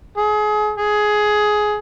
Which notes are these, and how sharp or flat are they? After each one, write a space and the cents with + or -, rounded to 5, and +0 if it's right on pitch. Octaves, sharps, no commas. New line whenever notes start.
G#4 +30
G#4 +15